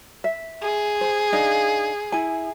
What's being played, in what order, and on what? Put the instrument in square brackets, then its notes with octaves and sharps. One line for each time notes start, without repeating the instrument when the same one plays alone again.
[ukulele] E5
[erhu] G#4
[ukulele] C5
D4 D#4 F5
E4 G#5